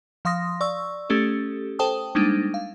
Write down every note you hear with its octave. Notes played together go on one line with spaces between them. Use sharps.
F3 F5 C6 D#6 A#6
D5 C#6 E6
A3 C#4 G4 A4
A4 C5 G5 A5 D#6
G3 G#3 A#3 D4 D#4
F5